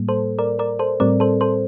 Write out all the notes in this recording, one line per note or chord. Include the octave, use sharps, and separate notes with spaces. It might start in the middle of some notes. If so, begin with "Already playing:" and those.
Already playing: A2 G3 A#3
A4 C5
A#4 D5
A#4 D5
A4 C5
A2 G3 C4 A#4 D5
A4 C5
A4 C5